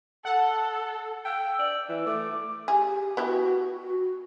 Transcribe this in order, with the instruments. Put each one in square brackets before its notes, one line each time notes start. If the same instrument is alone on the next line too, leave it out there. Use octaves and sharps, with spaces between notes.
[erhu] A4 [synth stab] F#5
[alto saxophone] G5 [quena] E6
[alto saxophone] D5
E3
[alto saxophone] A3 [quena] D6
[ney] G4 [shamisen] G#4
[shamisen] B3 E4 G4 [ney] F#4
[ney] F#4